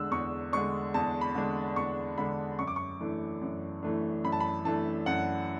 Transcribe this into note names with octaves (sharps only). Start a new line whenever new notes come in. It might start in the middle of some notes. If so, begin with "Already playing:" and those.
Already playing: E2 D3 G#3 D4 E6 F#6
E2 C#6
D3 G#3 D4 C#6
E2 A5
B5
D3 G#3 D4
E2 C#6
D3 G#3 D4 B5
F#2 C#6
D6
C#6
E3 A3 D4
F#2
E3 A3 D4
F#2 B5
A5
B5
E3 A3 D4 A5
F#2 F#5